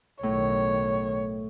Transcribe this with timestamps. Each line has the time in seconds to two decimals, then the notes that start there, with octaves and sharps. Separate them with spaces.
0.23 B1 A2 D#3 C#5